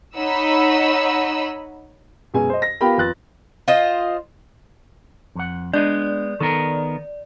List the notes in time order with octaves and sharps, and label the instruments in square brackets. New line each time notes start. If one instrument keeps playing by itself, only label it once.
[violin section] D#4 C#5 D#5 F#5 B5 E6
[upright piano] F#2 B2 G#3 G#5
C5 D#5
A#6
B3 F4 G4 A#4 G5 B5
F2 B4 F#6 A6
[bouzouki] F4 C5 D#5
[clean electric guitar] F2 F#5
[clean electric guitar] G#3 B3 [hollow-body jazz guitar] D4 D#5 [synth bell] D5
[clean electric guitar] D#3 B3 A#4 [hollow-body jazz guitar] A4